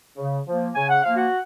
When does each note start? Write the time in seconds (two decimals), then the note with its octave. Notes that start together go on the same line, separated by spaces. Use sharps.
0.17 C#3
0.46 F3 A#3
0.75 C#3 G#5
0.89 F#5
1.03 F3 A#3 F5
1.17 F#4 F#5